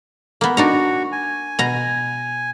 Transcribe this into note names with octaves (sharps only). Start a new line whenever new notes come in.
A#3 B3
D4 D#4 F#4 A#5 C#6
G#5
B2 A#5